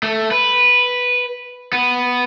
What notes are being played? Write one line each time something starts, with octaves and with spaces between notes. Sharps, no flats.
A3
B4
B3